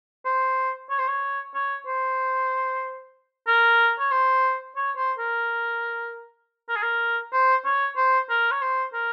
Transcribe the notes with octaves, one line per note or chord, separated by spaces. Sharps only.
C5
C#5
C5
C#5
C#5
C5
A#4
C#5
C5
C#5
C5
A#4
A#4
G#4
A#4
C5
C#5
C5
A#4
C#5
C5
A#4